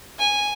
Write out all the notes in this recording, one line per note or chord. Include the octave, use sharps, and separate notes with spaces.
G#5